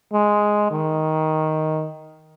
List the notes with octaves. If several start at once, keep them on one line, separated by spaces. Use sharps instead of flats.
G#3
D#3